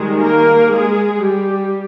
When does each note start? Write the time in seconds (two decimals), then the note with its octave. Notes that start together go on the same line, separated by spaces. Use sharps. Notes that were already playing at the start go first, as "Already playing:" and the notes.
Already playing: D#3 G3 G#3 G#4
0.22 A#3 A#4
0.73 G#3 G#4
1.23 G3 G4